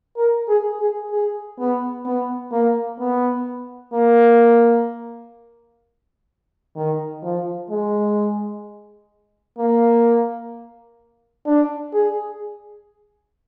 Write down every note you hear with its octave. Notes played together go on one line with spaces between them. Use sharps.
A#4
G#4
G#4
G#4
B3
B3
A#3
B3
A#3
D#3
F3
G#3
A#3
D4
G#4